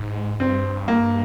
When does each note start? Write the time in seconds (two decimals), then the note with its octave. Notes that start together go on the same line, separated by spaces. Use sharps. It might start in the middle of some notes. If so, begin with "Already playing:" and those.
Already playing: G#2
0.40 G2 C4
0.88 A#3